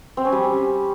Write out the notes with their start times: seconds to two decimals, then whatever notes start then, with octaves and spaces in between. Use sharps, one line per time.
0.17 C4
0.25 C#4
0.32 G3